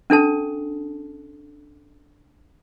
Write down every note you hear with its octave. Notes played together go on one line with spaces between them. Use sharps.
C#4 D4 A4 A5